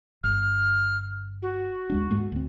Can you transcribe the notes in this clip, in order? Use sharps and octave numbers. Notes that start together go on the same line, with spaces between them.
G1 F6
F#4
D#2 G#3 D4
G#2 G#3 A3
D2 C4